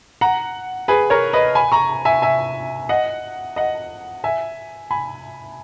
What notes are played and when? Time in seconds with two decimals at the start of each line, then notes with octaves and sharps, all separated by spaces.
0.21 F#5 A#5
0.88 G#4 B4
1.10 A#4 C#5
1.33 B4 D#5
1.55 G#5 B5
1.72 A#5 C#6
2.05 E5 G#5
2.22 E5 G#5
2.89 D#5 F#5
3.56 D#5 F#5
4.24 E5 G#5
4.91 G#5 B5